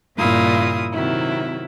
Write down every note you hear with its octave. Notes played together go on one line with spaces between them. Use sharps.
G2 A#2 C#3 E4 F4 D#6
C3 D#3 F#3 E4